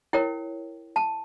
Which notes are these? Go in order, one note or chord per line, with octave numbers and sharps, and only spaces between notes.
E4 A#4 C#5 G5
A5